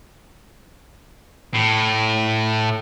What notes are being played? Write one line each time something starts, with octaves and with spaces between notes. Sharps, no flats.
A2